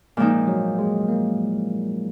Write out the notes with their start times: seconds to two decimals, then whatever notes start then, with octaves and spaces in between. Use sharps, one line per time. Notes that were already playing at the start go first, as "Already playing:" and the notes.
0.17 A#2 F3 G#3 C4 D#4
0.47 F#3
0.79 G#3
1.09 A#3